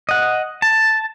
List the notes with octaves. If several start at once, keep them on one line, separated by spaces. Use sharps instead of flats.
D#5 F#5
A5